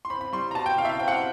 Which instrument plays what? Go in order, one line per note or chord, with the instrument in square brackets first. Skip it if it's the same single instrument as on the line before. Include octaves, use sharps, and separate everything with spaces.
[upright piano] C6
C4 B5
B5
G3 C6
A#5
B2 A5
G5
B2 F5
E5
F5
C4 G5
F#5
F5